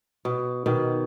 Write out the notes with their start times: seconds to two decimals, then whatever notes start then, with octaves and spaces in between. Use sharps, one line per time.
0.25 B2
0.66 B2 D#3